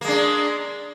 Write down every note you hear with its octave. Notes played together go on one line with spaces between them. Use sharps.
G#3 A#3 D4